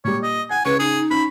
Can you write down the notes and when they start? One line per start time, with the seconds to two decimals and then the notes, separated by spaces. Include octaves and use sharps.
0.05 A#2 G3 C#5
0.23 D#5
0.50 F#5 G#5
0.65 C#3 B4 C#5
0.79 D#4 G#4
1.11 C#4 B5